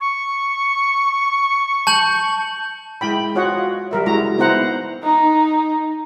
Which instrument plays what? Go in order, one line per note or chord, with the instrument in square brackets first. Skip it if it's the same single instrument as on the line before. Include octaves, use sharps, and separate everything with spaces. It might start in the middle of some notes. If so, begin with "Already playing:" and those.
[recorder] C#6
[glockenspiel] A5 G6 F#7
[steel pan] G#3 E4 G5 B5
F4 F#4 C#5 D#5 F#5
G3 A#4 E5
G#3 E4 F#4 A#5
B3 D#4 E4 C5 F#5 A#5
[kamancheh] D#4